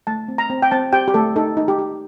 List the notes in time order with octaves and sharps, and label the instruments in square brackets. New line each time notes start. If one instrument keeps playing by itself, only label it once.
[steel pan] A3 A5
C4
A#5
C4
G5
C4 A5
G4 G5
G4
A3 A4
D#4 A4
D#4
G4
G4